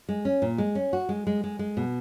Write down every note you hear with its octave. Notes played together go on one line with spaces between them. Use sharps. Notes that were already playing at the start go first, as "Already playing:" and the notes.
G#3
C#4
A#2
G#3
C#4
F#4
G#3
G#3
G#3
G#3
B2